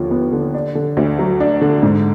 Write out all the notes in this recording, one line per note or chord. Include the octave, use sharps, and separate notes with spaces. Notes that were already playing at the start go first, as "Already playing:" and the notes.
Already playing: D#2 D3 F3
B3
D3
D4
D3
D2
F#3
D4
D3
G#2